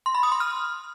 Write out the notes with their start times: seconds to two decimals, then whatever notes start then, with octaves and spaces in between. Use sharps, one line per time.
0.06 C6
0.15 B5
0.23 D#6
0.32 C6
0.40 F6